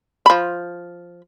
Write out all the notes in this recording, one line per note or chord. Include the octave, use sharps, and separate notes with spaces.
F3 B5